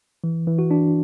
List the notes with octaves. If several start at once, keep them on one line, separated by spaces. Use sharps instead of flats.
E3
E3
F#4
D4